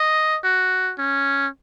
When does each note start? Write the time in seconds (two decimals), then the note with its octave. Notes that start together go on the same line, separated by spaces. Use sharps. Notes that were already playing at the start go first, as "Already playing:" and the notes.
Already playing: D#5
0.44 F#4
0.99 C#4